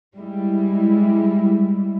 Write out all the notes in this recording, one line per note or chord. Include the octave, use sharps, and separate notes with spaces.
G3 G#3 E4